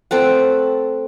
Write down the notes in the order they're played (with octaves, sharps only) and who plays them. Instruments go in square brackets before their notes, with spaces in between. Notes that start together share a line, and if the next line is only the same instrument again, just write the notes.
[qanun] A3 C4 A4 F#5